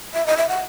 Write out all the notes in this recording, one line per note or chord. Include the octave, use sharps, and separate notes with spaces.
E5
D#5
E5
F#5